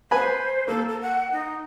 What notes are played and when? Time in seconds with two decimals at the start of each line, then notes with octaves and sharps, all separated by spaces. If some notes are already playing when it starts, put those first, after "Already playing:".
0.11 B4 C5 G#5 B5
0.67 A#3 A4
0.88 A4
1.01 F#5
1.32 D#4